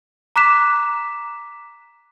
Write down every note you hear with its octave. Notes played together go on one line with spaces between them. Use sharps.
A#5 D6 F#6 B6 E7